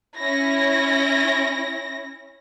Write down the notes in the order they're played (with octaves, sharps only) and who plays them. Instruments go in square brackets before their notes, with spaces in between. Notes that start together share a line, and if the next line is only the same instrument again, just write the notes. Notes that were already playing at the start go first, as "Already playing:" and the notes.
[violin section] C#4 E4 A#6